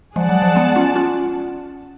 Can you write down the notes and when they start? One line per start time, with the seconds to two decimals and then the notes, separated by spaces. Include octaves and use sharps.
0.16 F3 G#3 G#4 D5 F#5 A5
0.29 F#3
0.42 F3
0.55 G#3 B3
0.76 C#4 F4
0.95 C#4 F4